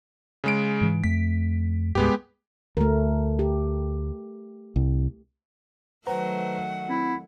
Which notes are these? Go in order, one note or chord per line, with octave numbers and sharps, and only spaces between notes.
C#3 G#3 D7
G#2 E3
F2 A3 B6
C2 G2 G#3 B3 G4
D2 A3 A#4
G4
C2
D#3 F#3 A3 B4 C5 F#5 A#5
C4 E4